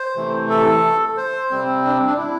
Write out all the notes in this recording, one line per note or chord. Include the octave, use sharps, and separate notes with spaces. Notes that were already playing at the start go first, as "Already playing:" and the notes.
Already playing: C5
C3 E3 A3
A4
C5
C3 G3 C4
D4
D4
E4